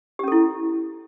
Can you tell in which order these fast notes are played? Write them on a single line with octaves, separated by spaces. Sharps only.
G4 C#4 A4 E4